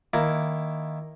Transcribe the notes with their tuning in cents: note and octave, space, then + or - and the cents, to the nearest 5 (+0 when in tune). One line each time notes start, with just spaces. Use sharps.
D#3 -5 A#3 +0 E4 +0